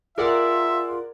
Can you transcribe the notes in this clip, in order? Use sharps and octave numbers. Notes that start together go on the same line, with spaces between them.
F4 G#4 A#4 D5 E5 F#5